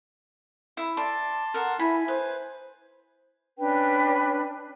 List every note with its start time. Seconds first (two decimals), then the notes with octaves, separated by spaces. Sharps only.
0.77 E4
0.97 D5 A5 C6
1.54 A#4 F#5
1.79 E4 G#5 B5
2.08 B4 C5
3.58 C#4 D4 B4 G5